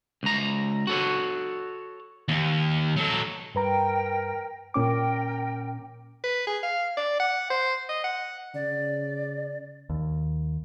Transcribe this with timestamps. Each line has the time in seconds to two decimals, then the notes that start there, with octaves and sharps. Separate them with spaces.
0.23 C#2 A#5
0.87 F#4 A4 C#5
2.29 D#2
2.97 F#3 A4
3.55 G2 A#4 B4 G5 A#5
4.74 A#2 C#4 A#4 G5 D6
6.24 B4
6.47 G#4
6.63 F5
6.97 D5
7.20 F#5
7.50 C5
7.89 D#5
8.04 F#5
8.54 C#3 D5
9.90 D#2